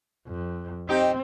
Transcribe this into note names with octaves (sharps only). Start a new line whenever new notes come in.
F2
C4 D#4 G4